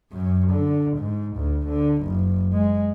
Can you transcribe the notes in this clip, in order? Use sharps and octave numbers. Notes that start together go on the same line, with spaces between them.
F#2
D3
G#2
D2
D3
F#1
G#3